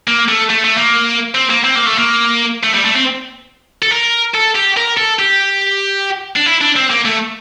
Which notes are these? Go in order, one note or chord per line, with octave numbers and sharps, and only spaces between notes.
A#3
A3
A3
A3
A#3
C4
A#3
C4
A#3
A3
A#3
A3
G3
A3
C4
A4
A#4
A4
G4
A#4
A4
G4
D4
E4
D4
C4
A#3
A3